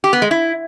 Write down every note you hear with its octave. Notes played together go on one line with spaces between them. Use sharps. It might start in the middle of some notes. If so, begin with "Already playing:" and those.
G4
B3
G#3
E4